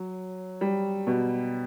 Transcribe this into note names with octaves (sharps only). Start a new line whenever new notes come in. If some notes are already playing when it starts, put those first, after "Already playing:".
Already playing: F#3
G3
B2